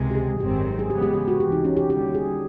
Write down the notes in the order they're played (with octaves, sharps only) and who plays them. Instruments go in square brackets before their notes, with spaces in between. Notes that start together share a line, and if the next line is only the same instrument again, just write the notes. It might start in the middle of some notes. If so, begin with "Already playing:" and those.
Already playing: [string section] C#2 C3 D#3 G#3
[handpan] G4
G#4
[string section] G#1 F#2 D#3 G#3 C4 [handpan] G4
[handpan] G#4
[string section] C#3 E3 G#3 B3 [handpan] G4
[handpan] G4
G4
F#4
[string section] C#2 C3 E3 [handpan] G4
[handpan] D#4
C#4
G4
[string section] D#2 D3 G3 [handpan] G4
[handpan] G#4